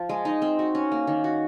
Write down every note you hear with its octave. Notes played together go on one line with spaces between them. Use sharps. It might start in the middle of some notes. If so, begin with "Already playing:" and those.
Already playing: F3
G#3
D#4
C4
F#4
C#4
A#3
D#3
F#4